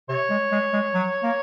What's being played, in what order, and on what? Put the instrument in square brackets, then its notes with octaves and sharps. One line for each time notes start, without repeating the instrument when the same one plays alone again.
[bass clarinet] C3 [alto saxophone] C#5
[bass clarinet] G#3
G#3
G#3
F#3
A#3